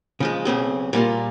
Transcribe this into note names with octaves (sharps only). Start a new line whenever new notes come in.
C#3 F3 G#3
B1 C#3 C4 G#4
A#2 G3 A#3 F4